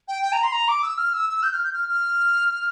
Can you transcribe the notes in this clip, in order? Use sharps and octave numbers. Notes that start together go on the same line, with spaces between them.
G5
G5
A#5
C6
A#5
D6
E6
F6
E6
E6
G6
F6
G6
F6
F6